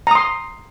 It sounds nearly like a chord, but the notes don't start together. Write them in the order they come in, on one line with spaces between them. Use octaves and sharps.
A#5 D#6 C6